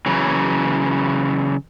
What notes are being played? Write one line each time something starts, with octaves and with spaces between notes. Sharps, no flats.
C#3 E3 F#3